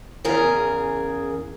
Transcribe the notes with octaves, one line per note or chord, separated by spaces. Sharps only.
E2 C#3 G#4 A#4